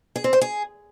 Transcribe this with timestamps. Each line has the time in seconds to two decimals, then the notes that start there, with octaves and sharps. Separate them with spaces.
0.16 G#4
0.24 C4
0.33 C5
0.41 G#4